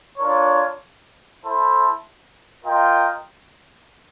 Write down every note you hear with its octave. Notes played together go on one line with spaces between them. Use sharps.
D4 F4 A#4 C#5
E4 A4 C5
F4 A#4 D#5 G5